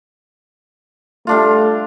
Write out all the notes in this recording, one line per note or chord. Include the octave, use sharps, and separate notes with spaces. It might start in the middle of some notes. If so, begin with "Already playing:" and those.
G3 A3 D4 F4